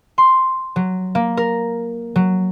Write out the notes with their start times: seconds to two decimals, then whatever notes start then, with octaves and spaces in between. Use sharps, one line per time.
0.18 C6
0.76 F#3
1.15 A#3
1.37 A#4
2.16 F#3